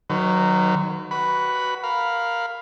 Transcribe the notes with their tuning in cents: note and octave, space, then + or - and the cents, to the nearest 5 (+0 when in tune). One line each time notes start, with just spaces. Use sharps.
D#3 -15 F#3 +0 B4 +40
F#4 +20 B4 +0 B5 +0
A#4 +0 F5 +5 B5 +0